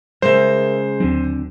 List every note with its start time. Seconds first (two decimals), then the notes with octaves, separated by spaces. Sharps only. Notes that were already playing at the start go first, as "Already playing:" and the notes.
0.22 C#3 G#3 A#4 C5 E5
1.00 D#2 D3 F#3 C4